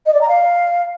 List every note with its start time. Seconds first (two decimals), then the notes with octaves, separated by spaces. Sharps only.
0.06 D#5
0.13 D5
0.21 A#5
0.28 F5